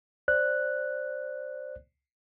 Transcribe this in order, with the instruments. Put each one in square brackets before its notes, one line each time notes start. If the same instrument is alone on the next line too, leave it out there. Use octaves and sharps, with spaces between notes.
[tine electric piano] C5 D5 F#6